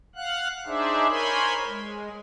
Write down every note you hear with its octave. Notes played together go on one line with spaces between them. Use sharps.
F5 F#5 F#6
D4 D#4 G#4 C5 D5 E5
A#4 C5 C#5 G#5 B5 C6
G#3